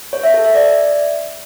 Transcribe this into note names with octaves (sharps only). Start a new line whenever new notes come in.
C#5
E5
A4
E5
D5